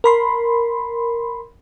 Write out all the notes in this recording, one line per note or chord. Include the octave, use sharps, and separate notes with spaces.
A#4 B5 C6